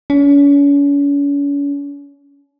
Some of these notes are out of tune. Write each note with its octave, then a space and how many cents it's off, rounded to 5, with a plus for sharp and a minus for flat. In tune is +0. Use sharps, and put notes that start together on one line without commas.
C#4 +40